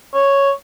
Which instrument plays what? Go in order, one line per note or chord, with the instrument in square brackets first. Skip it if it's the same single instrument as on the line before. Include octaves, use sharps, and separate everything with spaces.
[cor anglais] C#5